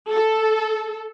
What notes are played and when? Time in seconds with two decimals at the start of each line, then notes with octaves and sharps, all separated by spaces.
0.10 A4